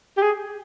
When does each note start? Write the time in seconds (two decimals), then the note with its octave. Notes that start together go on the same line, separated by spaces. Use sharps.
0.17 G4
0.22 G#4